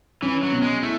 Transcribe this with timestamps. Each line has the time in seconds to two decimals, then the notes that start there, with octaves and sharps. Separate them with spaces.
0.22 E3 C#4
0.43 F#3
0.52 B2
0.62 G#3
0.82 A3 E4